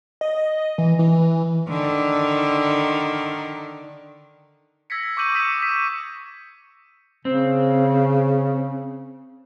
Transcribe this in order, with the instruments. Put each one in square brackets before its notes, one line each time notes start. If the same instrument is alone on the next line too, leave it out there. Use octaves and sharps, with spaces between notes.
[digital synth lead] D#5
E3
E3
[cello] D3 D#3
[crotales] E6 G#6 A#6 B6 C#7
C#6 D6 E6 G6 D#7 F#7
D6 D#6 G6 B6 C#7 E7
B6 D#7 E7
[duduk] C#3 [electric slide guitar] C4